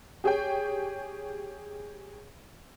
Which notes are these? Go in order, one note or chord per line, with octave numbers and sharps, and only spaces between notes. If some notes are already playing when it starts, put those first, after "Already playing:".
G4 G#4 C#5 G5